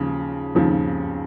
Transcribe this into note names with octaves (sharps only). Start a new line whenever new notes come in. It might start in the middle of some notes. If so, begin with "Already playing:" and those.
Already playing: D#2 C#3 F3
D#2 C#3 F3